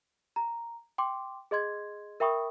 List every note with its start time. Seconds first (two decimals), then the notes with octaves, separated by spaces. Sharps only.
0.36 A#5
0.98 G5 C6 D6
1.51 G#4 D#5 C6 G#6
2.20 A#4 E5 G5 B5 C#6 D#6